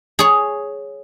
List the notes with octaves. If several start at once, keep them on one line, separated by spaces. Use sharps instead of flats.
G#4 C#5